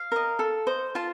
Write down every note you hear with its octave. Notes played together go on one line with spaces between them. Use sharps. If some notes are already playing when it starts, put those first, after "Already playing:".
Already playing: F5
A#4 D#5
A4
C5 D#5
F4 A5